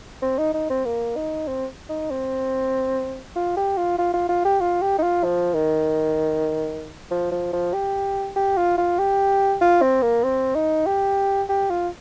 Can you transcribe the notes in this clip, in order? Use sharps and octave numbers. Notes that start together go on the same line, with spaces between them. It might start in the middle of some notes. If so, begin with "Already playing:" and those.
C4
D#4
D#4
C4
A#3
D#4
C4
D#4
C4
F4
G4
F4
F4
F4
F4
G4
F4
G4
D#4
F4
F3
D#3
F3
F3
F3
G4
G4
F4
F4
G4
F4
C4
A#3
C4
D#4
G4
G4
F4